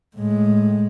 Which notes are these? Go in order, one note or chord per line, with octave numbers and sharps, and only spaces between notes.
A2 G#3